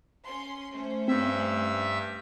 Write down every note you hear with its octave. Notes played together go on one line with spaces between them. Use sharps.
C#4 C6
A3 C#4 C5
G2 C4 E5 E6